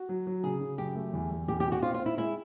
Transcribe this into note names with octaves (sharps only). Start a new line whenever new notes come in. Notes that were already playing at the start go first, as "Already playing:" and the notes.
Already playing: F#4
F#3
F#3
C#3 G#4
C#3
F#2 G4
A3
E2
E2
E2 G4
B2 G4
F#4
C4 F4
F4
C4
E4
G#3 E4